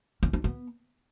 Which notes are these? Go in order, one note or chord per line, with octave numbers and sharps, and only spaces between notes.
C#4
D4
B3